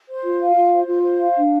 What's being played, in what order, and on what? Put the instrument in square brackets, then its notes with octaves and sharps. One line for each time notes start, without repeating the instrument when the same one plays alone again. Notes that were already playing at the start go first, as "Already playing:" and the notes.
[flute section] C5
F4
F5
F4
C5
F4
C5
F5
D4